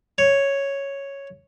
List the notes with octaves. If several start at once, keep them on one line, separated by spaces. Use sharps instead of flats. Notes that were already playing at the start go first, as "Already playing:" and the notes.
C#5